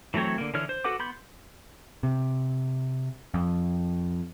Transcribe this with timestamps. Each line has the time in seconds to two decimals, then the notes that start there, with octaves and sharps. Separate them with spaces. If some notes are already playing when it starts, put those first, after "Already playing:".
0.14 E3 F#3 A3 C4 C#5
0.38 D3 A#3
0.54 D3 E3 C#5 F6
0.69 C5
0.84 F#4 A4 B4 F#5 D6
0.99 B3 B5 C6 G6
2.03 C3
3.34 F2